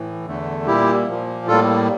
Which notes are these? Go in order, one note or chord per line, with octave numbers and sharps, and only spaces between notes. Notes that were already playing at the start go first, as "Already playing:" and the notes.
Already playing: A2 E3
E2 D3 A3
A#2 G3 A#3 E4 G4
A#2 F3 A#3
A2 G3 A#3 F4 A4